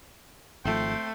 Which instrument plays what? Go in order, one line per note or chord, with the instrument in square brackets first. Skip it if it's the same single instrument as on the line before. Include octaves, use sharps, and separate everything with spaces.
[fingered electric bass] G#1 F3 [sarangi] A3 [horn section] C4 G5 C6